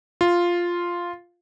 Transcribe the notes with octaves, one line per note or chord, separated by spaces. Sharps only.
F4